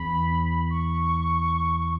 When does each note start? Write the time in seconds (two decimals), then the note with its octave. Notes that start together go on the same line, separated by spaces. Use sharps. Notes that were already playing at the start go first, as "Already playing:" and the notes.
Already playing: E2 B5
0.70 C#6